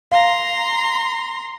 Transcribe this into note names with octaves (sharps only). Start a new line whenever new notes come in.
F5 A#5 C6